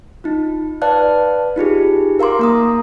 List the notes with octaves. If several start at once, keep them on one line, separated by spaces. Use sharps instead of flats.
D#4 F4
B4 D5 F5 A5 F#6
D#4 F4 G4 G#4
A#4 F5 A#5 C6 D6
A#3 A#5 D#6